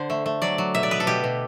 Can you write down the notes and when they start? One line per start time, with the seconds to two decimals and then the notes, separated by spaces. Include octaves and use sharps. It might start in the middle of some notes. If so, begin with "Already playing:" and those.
Already playing: D3 C5
0.10 A3
0.26 A3
0.42 F#3 D5
0.58 F#3
0.75 B2 E5
0.83 D5
0.91 B3 B4
1.00 A4
1.07 B2 G4
1.24 B2